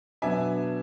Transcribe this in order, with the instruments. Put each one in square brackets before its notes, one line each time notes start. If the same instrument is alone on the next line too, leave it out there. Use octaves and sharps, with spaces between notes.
[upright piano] B2 F#3 B3 D4 E5 G#5